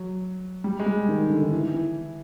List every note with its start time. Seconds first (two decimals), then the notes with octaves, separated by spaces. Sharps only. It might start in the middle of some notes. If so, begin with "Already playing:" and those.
Already playing: F#3
0.64 G3
0.80 G#3
0.86 G3
1.09 D#3
1.30 D3
1.43 D#3
1.51 E3
1.74 E3